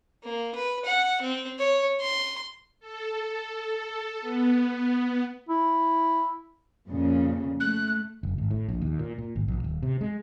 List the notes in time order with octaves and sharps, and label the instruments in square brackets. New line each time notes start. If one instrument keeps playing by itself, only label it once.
[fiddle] A#3
B4
F#5
C4
C#5
C6
[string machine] A4
B3
[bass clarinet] E4
[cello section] F2 A#2 C#3
[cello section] A3 [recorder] F#6
[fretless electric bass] F#1
G#1
A2
A#1
D#2
A#2
A#2
G#1
A#1
D#1
C3
G#3